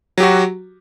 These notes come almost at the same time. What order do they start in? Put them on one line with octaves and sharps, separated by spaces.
F#3 G4 F#4